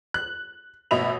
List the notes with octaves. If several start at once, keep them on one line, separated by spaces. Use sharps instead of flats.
F#6
A1 B2 D#5 E5 B5 F7